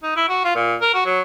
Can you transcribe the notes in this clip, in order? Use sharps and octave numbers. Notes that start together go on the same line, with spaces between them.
D#4
E4
F#4
F4
A#2
A#4
F#4
F#3